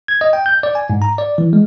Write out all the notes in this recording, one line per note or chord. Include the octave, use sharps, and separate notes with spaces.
G#6
D#5
G5
G6
D5
G#5
G#2
A#5
D5
E3
G#3